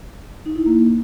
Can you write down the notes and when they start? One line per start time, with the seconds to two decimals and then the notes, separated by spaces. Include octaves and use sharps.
0.46 D#4
0.56 E4
0.66 A#3